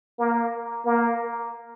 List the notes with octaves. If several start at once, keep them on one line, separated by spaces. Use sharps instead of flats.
A#3
A#3